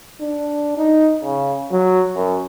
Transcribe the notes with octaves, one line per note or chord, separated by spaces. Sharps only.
D4
D#4
C#3
F#3
F#2